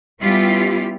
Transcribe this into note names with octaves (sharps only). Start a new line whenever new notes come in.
G3 B3 C#4 E4 F4 G4